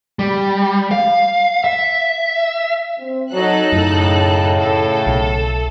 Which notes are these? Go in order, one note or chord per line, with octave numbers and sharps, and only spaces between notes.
G3
F5
E5
C4
F#3 D#4 A4 F#6
F#2 A2 C#3
A4
B1